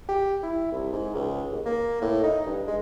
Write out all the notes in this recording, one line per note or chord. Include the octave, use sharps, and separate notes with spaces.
G4
E4
C2
G#2
C#2
D#2
A#3
A2
D#4
G2
G#3